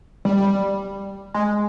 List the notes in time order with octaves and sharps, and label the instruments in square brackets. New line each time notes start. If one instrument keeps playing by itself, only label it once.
[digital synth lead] G3
G#3